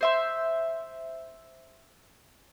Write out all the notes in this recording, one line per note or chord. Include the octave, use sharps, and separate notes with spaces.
C5 E5 C6